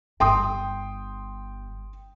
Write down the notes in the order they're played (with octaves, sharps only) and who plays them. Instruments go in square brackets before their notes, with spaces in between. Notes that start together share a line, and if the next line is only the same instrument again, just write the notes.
[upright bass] G1 [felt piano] G5 C6 D#6